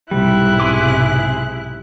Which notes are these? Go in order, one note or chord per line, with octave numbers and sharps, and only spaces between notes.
B1 G#2 C3 G3 E4 F#6
G#4 C6 D6